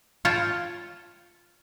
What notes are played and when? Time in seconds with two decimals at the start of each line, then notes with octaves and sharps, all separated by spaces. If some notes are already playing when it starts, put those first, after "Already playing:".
0.25 F4 C#5 G5 A5